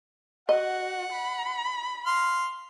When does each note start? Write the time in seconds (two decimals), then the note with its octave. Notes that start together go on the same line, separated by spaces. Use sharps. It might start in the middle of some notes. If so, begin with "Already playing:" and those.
0.49 F#4 D#5 F#5
1.12 B5
2.06 F5 C6